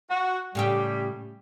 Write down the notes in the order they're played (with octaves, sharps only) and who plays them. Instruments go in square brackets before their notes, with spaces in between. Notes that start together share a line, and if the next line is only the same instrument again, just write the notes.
[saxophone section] F#4
[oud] A2 C#3 G4 [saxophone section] G3